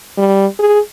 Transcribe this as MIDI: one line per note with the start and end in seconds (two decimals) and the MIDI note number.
0.18 0.47 55
0.59 0.80 68